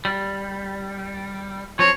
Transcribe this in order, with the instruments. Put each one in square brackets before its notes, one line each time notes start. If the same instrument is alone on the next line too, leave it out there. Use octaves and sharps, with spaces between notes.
[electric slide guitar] G3
[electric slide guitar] F3 C4 [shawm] C#5